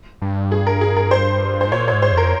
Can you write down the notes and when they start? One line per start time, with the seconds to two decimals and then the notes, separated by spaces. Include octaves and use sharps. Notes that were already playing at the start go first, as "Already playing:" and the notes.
0.22 G2
0.52 G#4
0.67 A#4
0.81 G#4
0.97 A#4
1.11 C5
1.61 C5
1.67 G#2
1.72 A#2 C#5
1.88 C#5
1.92 G#2
2.02 C5
2.12 F2
2.17 A#4